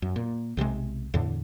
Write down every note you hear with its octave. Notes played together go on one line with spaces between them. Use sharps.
F#2
A#2
B1 C3 E3 G#3
E2 A2 D3